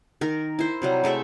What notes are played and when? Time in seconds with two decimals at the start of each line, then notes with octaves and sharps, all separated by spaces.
0.21 D#3 A#4
0.59 E4 C5
0.82 C3 F#3 G3
1.04 G#3 A3 A4 E5